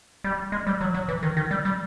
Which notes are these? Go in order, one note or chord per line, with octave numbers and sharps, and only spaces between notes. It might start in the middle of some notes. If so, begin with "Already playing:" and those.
G3
G#3
G3
F#3
F#3
E3
D#3
D#3
G3
G3